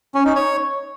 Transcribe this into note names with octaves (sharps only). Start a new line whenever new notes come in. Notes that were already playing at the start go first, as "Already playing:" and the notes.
C#4
D#4
C#5